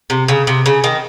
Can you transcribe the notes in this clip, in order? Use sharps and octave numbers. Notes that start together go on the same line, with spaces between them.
C3
C#3
C3
C#3
D#3